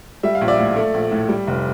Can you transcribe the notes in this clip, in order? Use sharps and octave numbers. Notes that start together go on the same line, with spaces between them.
G3 E5
F5
A#1
D5 E5
A2
A3
A#1
A2
G3
F1